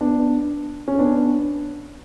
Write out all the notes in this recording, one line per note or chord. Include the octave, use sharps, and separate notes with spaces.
B3 D4
C#4
B3 D4